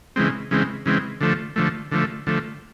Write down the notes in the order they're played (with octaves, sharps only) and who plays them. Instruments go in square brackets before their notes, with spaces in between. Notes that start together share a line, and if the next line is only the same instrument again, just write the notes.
[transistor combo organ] C#3 E3 G#3 C4
C#3 E3 G#3 C4
C#3 E3 G#3 C4
D3 F3 A3
D3 F3 A3
D3 F3 A3
D3 F3 A3